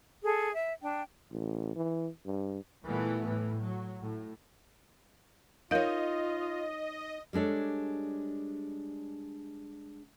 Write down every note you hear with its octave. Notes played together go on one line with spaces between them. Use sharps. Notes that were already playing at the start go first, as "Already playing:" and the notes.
G#4 A4
E5
D4 G5
A1
E3
G2
A#2 E3 G3 A3 B3
A2 E3
F#3
A2
D#4 F4 A#4 C#5 D#5 F5
G3 G#3 D4 A4 C#5